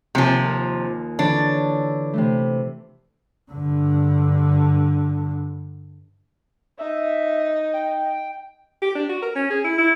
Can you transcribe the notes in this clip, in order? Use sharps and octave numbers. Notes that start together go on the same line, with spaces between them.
D#2 C3 F3 F4 G#5
A#4
D3 E3 D4 C#5
C3 E3 A3
G2 D3
D#4 E5
G5
G4
D4
F#4
A#4
C#4
G#4
E4
E4